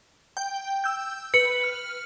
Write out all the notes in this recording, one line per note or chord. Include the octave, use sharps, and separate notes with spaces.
G5
E6 G6
B4 C#7
F6